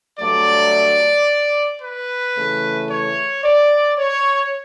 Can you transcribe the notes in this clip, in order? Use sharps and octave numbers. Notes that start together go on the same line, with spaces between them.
G2 F#3 A3 D5
B4
C#3 E3 A3
C#5
D5
C#5